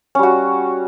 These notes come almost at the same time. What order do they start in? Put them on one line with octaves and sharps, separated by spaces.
C#4 G3 F#4